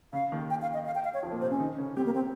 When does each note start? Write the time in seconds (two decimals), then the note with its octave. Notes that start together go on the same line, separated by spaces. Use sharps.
0.13 C#3 F5
0.32 D#2 D#3
0.50 G5
0.62 F5
0.74 D#5
0.86 F5
0.95 G5
1.04 F5
1.14 C#5
1.23 F2 F3
1.32 A#2 A#3
1.41 C3 C4 C5
1.51 C#4
1.59 D#3 D#4
1.78 C#3 C#4
1.96 G3 C4 G4
2.05 A#3
2.14 C4